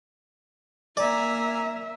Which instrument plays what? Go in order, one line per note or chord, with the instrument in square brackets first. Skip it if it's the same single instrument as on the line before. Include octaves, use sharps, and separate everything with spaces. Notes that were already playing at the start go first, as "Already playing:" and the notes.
[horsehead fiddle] A#3 E5 [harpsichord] D5 [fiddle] G#5 A#5